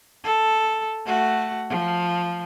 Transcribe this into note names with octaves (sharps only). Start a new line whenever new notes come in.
A4
A3 F#4
F3